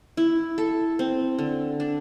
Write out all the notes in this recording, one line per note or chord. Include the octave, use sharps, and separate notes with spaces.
E4
A4
C4
D3
D4